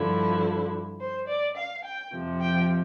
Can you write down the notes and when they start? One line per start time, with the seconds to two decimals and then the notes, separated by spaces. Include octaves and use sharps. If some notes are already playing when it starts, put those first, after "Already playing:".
Already playing: G2 D3 F3 E4
1.00 C5
1.28 D5
1.56 F5
1.84 G5
2.13 F2 C3 F3
2.41 G5